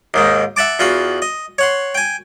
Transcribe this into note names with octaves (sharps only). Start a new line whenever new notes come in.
D#2 G#2 D#3
E5 F#5 A5 D6
E2 F4 F#4 B5
D#5
C#5 F#5 C6
G5 G#5